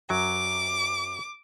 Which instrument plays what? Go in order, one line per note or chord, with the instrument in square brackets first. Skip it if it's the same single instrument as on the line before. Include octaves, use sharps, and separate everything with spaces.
[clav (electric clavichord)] F#2 F#3 [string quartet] D6